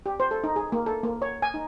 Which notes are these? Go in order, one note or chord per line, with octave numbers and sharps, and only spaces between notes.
G4
C5
A4
D#4
G#4
A#3
A4
A#3
C#5
G#5
D#4